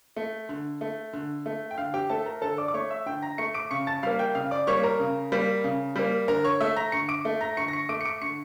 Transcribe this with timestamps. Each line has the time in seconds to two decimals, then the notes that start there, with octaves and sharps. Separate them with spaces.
0.16 A3
0.49 D3
0.81 A3
1.13 D3
1.46 A3
1.71 G5
1.78 D3 F5
1.94 G4 G5
2.10 A3 A4 A5
2.26 A#4 A#5
2.42 D3 A4 A5
2.58 D5 D6
2.68 D6
2.74 A3 C#5 C#6
2.90 E5 E6
3.06 D3 G5 G6
3.22 A#5 A#6
3.38 A3 C#6 C#7
3.54 D6 D7
3.71 C#3 C#6 C#7
3.87 A5 A6
4.03 G3 A#3 F5 F6
4.19 G5 G6
4.35 C#3 F5 F6
4.51 D5 D6
4.67 G3 A#3 C#5 C#6
4.84 A#4 A#5
5.00 C#3
5.32 G3 A#3
5.64 C#3
5.96 G3 A#3
6.28 D3 A#4 A#5
6.44 C#5 C#6
6.60 A3 E5 E6
6.76 A#5 A#6
6.92 D3 C#6 C#7
7.09 D6 D7
7.25 A3
7.41 A#5 A#6
7.57 D3 C#6 C#7
7.68 A#6
7.73 C#6 C#7
7.89 A3 D6 D7
8.01 C#7
8.05 D6 D7
8.21 D3 C#6 C#7